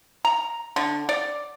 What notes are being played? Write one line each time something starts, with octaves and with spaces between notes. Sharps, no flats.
A#5
D3
D5